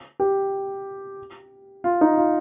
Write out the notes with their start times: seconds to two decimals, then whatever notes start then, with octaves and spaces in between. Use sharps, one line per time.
0.20 G4
1.84 F4
2.01 D#4
2.18 F4